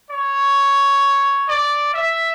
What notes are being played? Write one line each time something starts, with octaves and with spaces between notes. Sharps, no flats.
C#5
D5
E5